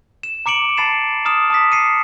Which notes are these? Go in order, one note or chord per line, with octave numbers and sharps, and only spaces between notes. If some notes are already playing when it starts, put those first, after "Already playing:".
E7
A#5 D6 C#7 D7 F#7
A5 B5 A6 C7 E7
A#5 D#6 F6 E7
A5 D#6 B6
C7 C#7 D#7